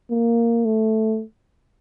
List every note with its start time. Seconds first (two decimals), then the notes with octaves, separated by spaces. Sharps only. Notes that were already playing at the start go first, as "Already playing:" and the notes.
0.11 A#3
0.65 A3